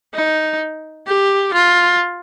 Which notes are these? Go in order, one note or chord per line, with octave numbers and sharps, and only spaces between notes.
D#4
G4
F4